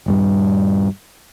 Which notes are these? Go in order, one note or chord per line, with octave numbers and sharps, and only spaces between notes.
D#1 G2 G3